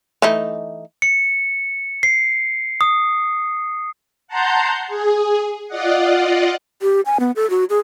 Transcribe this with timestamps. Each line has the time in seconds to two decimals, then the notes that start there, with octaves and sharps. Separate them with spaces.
0.22 E3 A3 D#4
1.02 C#7
2.03 C7
2.81 D#6
4.28 F#5 A5 A#5 C6 G6
4.87 G#4
5.68 F4 D5 D#5 F#5
6.82 G4
7.06 G#5
7.20 B3
7.36 A4
7.50 F#4
7.70 G#4